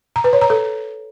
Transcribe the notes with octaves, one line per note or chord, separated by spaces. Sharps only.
A#5
B4
C#5
A#5
A4